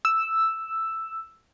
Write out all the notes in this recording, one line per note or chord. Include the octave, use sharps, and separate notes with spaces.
E6